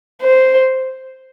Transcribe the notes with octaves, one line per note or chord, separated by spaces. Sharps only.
C5